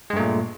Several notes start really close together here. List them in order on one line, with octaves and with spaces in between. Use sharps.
G#3 G2 A3 A#2